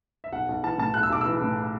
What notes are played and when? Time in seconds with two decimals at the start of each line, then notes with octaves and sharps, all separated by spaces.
0.24 E5
0.32 B1 F#5
0.49 B1
0.63 E3 A5
0.78 A2 A5
0.94 B1 F#6
1.03 E6
1.10 B1 D6
1.21 E3 E6
1.41 A2